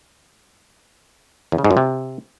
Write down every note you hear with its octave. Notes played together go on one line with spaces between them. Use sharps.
E2
C#3
G#2
F#2
C3